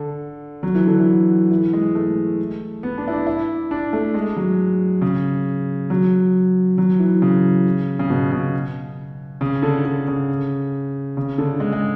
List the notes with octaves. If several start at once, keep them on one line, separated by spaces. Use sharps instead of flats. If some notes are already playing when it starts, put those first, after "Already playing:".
Already playing: D3
F#3
E3
D3
E3
E3
G#3
A3
B3
D4
E4
D4
E4
D4
A3
G#3
F#3
C#3
F#3
F#3
E3
C#3
C#3
B2
C#3
C#3
D3
D3
C#3
C#3
D3
G#3
G#3